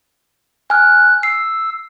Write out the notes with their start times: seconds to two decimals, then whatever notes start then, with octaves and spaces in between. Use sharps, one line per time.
0.70 G#5 F6 F#6
1.23 E6 C7